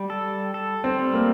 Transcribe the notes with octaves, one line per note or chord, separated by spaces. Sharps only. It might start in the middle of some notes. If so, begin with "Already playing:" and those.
Already playing: G3
A4
A4
C4
G3
A#3